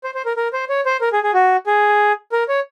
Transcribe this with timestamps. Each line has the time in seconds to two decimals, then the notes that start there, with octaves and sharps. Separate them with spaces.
0.04 C5
0.15 C5
0.25 A#4
0.37 A#4
0.53 C5
0.69 C#5
0.86 C5
1.01 A#4
1.13 G#4
1.24 G#4
1.34 F#4
1.67 G#4
2.32 A#4
2.48 C#5